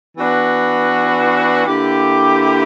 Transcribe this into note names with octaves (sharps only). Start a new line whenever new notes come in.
E3 B3 D4 F#4
D3 A#3 E4 G4